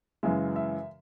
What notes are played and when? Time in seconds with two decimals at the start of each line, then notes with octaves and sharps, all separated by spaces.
0.23 F#2 C#3 E3 G#3 E5
0.56 E5